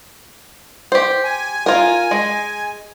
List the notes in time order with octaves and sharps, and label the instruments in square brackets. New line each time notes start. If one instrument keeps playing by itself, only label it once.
[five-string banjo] G4 C5
[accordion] G#5
[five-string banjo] F4 A#4
G#3